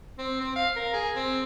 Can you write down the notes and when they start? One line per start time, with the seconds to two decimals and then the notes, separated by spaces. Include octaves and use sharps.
0.18 C4
0.41 C4
0.56 F5
0.76 A#4
0.93 G#4
1.15 C4